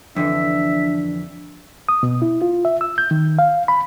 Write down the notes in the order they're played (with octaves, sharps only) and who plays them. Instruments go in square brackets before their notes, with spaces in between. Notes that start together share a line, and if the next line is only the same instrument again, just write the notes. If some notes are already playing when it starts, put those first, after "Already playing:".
[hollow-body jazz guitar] F2 D3 E3 [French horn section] D4 [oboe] E5
[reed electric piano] D#6
B2
E4
F4
E5
E6
G6
D#3
F5
B5